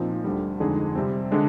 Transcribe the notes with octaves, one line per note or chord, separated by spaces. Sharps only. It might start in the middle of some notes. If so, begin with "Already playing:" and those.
Already playing: A#2 F3 C4 D#4
D2 D3 G3
F2 D3 G#3 D#4 G#4
C3 G3 C4
D3 G#3 D4